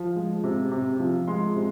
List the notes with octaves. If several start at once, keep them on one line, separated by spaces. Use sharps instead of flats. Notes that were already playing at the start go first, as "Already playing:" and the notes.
Already playing: F3
G#3
C3
C3
F3
G#3 C6
C3